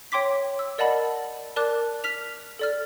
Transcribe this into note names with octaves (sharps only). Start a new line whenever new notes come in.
C#5 G5 C6 D6 B6
E6
A#4 D5 D#5 F#5 A5 B5
A#4 D5 A5 D6 F#6
F6 B6 F7
A4 D5 F6